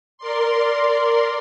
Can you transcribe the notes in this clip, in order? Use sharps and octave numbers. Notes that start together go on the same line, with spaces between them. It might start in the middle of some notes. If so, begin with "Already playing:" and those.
A#4 D5 C6